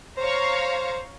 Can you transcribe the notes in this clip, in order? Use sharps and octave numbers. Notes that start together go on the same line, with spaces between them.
C5 C#5 F5 A#5